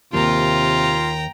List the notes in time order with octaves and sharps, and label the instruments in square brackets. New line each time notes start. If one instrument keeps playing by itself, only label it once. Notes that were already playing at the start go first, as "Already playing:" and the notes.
[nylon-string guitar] D#2 A#4 [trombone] C3 [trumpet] F4 [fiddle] G5 A#5